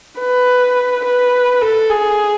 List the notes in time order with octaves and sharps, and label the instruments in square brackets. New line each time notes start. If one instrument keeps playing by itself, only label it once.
[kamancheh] B4
B4
A4
G#4